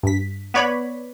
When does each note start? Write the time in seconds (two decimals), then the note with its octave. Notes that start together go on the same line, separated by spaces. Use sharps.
0.03 G2 B6
0.54 B3 B4 C#5 D5 B5